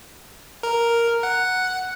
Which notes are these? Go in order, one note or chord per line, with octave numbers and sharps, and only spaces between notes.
A#4
F#5